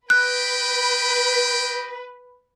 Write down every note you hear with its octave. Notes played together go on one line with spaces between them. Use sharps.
G4 B4 D#5 G5 F#6